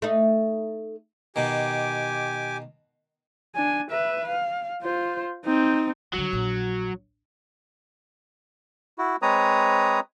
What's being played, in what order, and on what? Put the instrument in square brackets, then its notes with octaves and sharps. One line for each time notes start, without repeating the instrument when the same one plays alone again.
[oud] A3 D#4
[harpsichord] B2 D#3 [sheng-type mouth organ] G4 G#5 D6
[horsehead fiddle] D4 G#5
B4 E5
F5
F4 C5
C4 D#4
[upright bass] D3 G3 [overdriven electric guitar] F#3
[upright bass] A#1
[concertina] E4 F#4
G#3 C4 B4 C#5 A#5 D#6